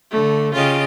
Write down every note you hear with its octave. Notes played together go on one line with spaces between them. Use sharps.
D3 A3
C#3 F4 G4 D#5